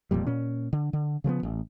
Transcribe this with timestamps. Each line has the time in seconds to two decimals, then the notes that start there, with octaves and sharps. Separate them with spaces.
0.11 E1 F2 A#2 G3
0.27 A#2 C#4
0.73 D3
0.93 D3
1.24 C#3 F3 A3 B3
1.43 A1